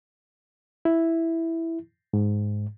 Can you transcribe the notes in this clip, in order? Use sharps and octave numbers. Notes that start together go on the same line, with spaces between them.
E4
G#2